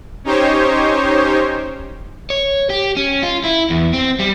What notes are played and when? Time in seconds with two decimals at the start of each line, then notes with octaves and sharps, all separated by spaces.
0.24 C#4 D#4 G4 C5 C#5
2.30 C#5
2.70 G4
2.96 C#4
3.23 F4
3.44 E4
3.70 E2
3.93 C4
4.19 G3